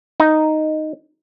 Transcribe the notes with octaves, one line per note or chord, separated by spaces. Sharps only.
D#4